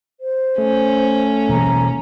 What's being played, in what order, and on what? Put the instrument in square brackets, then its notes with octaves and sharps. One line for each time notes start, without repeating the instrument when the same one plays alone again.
[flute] C5
[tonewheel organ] A3 [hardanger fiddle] C#4
[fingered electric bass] B2 E3 A#3 [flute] A#5